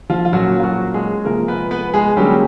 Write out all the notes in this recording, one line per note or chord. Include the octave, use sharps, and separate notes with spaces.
F3 F4
F4
A#2 F#3 A#3 C#4 F#4
F4
F#3 F#4
G#3 G#4
C3 F3 G#3 A#3 A#4
B3 B4
B3 B4
G#3 G#4
D3 F#3 G3 A#3 C#4 G4